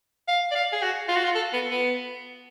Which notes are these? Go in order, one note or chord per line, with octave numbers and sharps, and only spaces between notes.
F5
D5
F5
G#4
F#4
F4
F#4
F4
A4
B3
B3